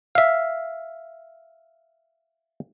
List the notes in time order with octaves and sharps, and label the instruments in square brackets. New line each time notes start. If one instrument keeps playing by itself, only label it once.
[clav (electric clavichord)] E5 F5